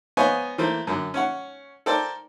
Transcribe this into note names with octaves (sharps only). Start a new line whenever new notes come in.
B3 C5 C#5 D#5 F5 G#5
E3 A3 A#3 C5
F#2 D3
C#4 C#5 F#5
A4 A#4 C5 D5 G5